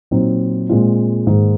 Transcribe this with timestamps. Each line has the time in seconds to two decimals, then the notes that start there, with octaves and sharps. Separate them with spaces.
0.11 A#2 F#3 C4 D#4
0.69 A#2 G#3 C4 F4
1.27 G#2 D#3 A#3